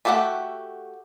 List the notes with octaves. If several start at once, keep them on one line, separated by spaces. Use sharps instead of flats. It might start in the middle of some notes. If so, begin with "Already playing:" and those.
A3 F#4 G4 A4 F#5